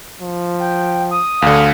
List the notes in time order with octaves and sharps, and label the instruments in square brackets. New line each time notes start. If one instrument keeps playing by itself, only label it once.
[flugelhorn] F3
[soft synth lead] G5
D#6
[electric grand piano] D2 D3 [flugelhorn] F5